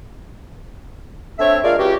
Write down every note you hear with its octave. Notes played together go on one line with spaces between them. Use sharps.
A3 C4 D4 C#5 E5
G#3 D4 F4 A#4 D5 F5
C#2 F#4 G4